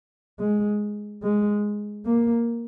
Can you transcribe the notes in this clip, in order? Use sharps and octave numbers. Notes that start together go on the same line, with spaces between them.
G#3
G#3
A#3